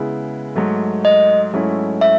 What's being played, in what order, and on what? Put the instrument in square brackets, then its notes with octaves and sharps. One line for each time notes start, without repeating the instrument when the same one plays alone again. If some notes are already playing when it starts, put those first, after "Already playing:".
Already playing: [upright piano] C#3 G#3 B3 E4
G#2 F#3 A3
[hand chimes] D#5
[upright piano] G#2 F#3 A3 C#4 E4
[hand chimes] E5